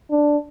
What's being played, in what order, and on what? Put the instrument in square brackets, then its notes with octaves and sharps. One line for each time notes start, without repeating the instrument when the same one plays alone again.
[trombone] D4